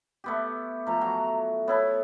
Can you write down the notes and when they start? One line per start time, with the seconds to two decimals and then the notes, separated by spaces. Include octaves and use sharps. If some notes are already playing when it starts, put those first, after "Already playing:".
0.24 A3 B3 G4
0.87 F3 A3 A#5
1.01 F#3
1.68 B3 E4 A4 C#5